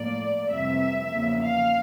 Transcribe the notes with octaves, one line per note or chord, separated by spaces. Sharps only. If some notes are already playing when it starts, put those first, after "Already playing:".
Already playing: A2 F3 A#3 D5
F2 C3 E3 G3 E5
E2 C#3 F3 A#3
F5